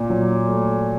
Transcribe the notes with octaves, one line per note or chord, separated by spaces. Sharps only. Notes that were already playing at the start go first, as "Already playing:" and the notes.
Already playing: A#2
F#3
A3